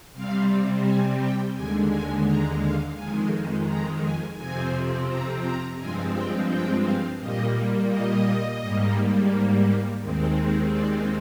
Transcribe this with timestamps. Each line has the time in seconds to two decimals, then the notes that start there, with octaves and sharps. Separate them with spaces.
0.13 C3 G3 C4 F5
0.84 G#5
1.20 G5
1.55 D#2 D3 G#3 G#5
1.90 G#5
2.26 A#5
2.61 F5
2.96 F2 D#3 G#3 G#5
3.67 A#5
4.02 G#5
4.37 F2 C3 F3 C4 G#5
5.08 A#5
5.42 A#5
5.78 G2 F3 G#3 C4 G#5
6.13 G5
6.49 G5
6.83 F5
7.19 A#2 G3 A#3 D#5
7.89 D#5
8.60 G#2 G3 A#3
10.01 D#2 D#3 G#3 C4
10.71 D5